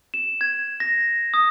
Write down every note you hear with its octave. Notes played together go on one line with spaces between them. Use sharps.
E7
G#6
A#6
D#6